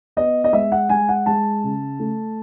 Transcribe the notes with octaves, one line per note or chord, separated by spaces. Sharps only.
B3 D#5
D#5
G#3 E5
F#5
G#3 G#5
F#5
G#3 A5
C#3
A3